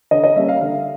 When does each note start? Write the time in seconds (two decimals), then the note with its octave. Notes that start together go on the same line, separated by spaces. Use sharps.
0.11 D3 D#5
0.24 D#5
0.36 G3 A#3 C#4 E5
0.48 F5
0.61 D3 F5